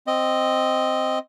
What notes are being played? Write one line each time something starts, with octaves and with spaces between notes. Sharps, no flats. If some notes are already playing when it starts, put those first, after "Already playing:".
C4 D#5